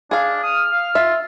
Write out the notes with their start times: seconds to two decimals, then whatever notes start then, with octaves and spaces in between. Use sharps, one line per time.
0.11 D4 G#4 F5
0.43 D#6 F6
0.72 F5
0.95 F4 E5